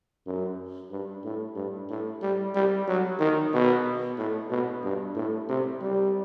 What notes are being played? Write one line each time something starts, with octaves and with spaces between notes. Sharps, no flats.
F#2
G2
A2
G2
A2
G3
G3
F#3
D#3
B2
A2
B2
G2
A2
C3
G3